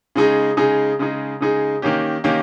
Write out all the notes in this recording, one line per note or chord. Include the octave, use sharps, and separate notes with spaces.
C#3 G#3 D#4 G#4
C#3 G#3 D#4 G#4
C#3 G#3 D#4 G#4
C#3 G#3 D#4 G#4
D#3 A#3 C#4 G4
D#3 A#3 C#4 G4